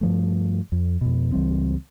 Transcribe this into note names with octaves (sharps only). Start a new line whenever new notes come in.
G2 F3 A3
F2
F2 B2
C#2 E3 G3 C4